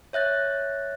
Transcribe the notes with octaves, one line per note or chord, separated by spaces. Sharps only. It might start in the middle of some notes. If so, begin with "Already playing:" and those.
C#5 E5 F#6 A6